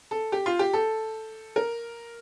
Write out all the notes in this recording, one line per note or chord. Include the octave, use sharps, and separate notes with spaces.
A4
G4
F4
G4
A4
A#4